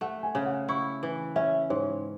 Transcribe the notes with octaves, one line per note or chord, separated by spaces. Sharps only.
A3 F#5
G#5
C#3
F#5
E4 C#6
E3
C#4 E5
G#2 C#5